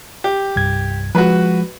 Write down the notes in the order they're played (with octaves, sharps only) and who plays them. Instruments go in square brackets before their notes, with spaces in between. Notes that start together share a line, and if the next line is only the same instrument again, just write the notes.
[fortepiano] G4
[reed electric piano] C2 G2 G#6
[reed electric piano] F3 G#3 [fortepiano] F#4 B4